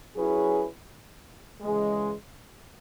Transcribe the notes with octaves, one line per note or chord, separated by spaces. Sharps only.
F#3 C#4 E4 G#4 B4
C#3 E3 G#3